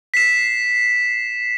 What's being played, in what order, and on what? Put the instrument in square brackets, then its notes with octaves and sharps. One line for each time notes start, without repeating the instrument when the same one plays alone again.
[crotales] B6 C7 E7